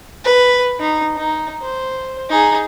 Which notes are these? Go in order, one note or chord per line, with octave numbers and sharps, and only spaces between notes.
B4
D#4
D#4
C5
D#4 G#4